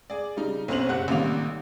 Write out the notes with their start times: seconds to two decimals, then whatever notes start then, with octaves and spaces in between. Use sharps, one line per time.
0.10 G#4 D5
0.37 C#3 G3 D#4
0.68 B1 F2 C#4 C5 F7 F#7
0.89 F#1 C4 G4 F#5 F#6
1.08 A1 A#2 D#3 G3 A#3 F7